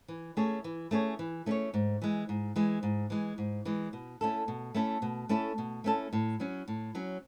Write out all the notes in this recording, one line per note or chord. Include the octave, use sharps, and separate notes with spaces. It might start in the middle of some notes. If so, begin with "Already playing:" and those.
E3
A3 C#4 G#4 C#5
E3
A3 C#4 G#4 C#5
E3
A3 C#4 G#4 C#5
G#2
E3 G#3
G#2
E3 G#3
G#2
E3 G#3
G#2
E3 G#3
B2
A3 C#4 E4 A4
B2
A3 C#4 E4 A4
B2
A3 C#4 E4 A4
B2
A3 C#4 E4 A4
A2
F#3 C#4
A2
F#3 C#4